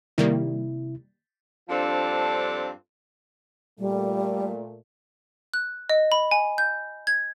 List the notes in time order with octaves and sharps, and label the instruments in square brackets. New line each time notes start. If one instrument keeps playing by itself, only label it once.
[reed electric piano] C3 E4 [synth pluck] D#3 G3 A#3
[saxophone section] G2 F3 C4 D4 F4 A4
[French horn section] A#2 A3 [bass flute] G3
[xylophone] F#6
D#5
B5
G#5
G6
G#6